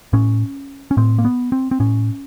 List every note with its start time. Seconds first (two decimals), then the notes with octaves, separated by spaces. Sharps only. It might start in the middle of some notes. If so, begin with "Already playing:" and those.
0.13 A2 C#4
0.91 C#4
0.97 A2 C4
1.18 A#3
1.25 B3
1.52 C4
1.71 C4
1.80 A2 C#4